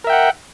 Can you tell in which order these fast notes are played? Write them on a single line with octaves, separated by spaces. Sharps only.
A#4 E5 G5 F#5